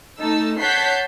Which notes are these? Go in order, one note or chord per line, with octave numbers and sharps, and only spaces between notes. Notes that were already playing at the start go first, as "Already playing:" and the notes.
A3 D#4 A5 E6
C#5 F#5 A5 G6 B6 C7